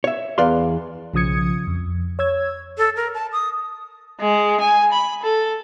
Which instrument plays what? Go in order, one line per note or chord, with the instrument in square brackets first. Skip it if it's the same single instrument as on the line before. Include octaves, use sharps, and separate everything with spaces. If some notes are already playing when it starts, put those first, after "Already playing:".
[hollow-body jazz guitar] C#5 E5
E2 B4 D5 F5 C6
[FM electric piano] B1 C#3 F3 D#6 G#6 C#7
F2
C#5 E6 G#6
[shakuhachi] A4
A#4
A5
D#6
[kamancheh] G#3
G#5
B5
A4